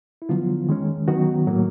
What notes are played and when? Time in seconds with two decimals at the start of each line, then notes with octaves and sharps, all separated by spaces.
0.22 E4
0.29 D3 F3 F#3 B3 F4
0.69 D#3 G#3 C#4
1.08 D#3 F#3 B3 F#4
1.47 A2 F#3 A#3